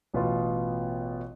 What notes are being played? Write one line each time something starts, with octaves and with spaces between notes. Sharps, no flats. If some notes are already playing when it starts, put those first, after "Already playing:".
A1 B2 B3 F4